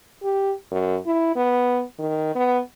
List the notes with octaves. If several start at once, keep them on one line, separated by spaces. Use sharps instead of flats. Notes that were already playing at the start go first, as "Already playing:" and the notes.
G4
F#2
E4
B3
D#3
B3